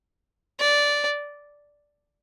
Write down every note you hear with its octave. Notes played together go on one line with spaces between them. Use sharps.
D5